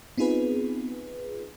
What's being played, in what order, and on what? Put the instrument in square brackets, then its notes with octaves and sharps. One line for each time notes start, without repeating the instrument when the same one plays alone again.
[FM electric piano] B3 C4 D#4 F4 G#4 B4